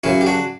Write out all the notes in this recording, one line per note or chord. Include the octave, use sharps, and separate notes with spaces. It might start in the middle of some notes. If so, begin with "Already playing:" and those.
F#2 C#3 F#3 C#4 E4
G4
D4 F#4